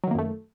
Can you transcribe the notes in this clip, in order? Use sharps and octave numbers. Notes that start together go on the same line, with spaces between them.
F#2 D#3 F#3 A3 A#3